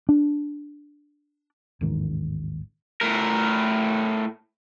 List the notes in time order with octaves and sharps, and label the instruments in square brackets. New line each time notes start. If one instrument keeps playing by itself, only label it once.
[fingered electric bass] D4
A1 D#2 G#2 D#3
[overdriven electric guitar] A2 A#4